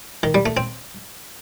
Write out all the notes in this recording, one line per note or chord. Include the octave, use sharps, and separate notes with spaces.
D#3
G3
A3
C4